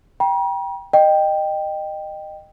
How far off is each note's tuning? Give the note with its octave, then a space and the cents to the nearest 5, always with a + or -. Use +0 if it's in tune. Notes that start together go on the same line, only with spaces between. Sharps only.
G5 +0 A#5 +45
D#5 -20 G5 +0